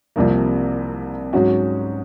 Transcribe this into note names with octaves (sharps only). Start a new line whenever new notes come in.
C2 C3 F3 A#3
G#2 F#3 C#4 F#4